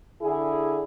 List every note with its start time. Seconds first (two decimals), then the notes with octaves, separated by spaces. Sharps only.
0.22 D3 E4 G#4